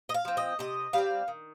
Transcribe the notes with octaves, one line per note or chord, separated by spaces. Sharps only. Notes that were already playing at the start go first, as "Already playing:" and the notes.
D#5
F5
F3 C4
D#5
C3 D#5
G3 C4 F5
D#3